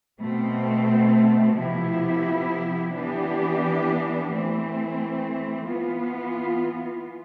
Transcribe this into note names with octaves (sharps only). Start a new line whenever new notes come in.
B2 A3 C4
C3 F3 B3 E4 G4
E3 B3 D4 G4
E3 A3 C4
E3 B3 F4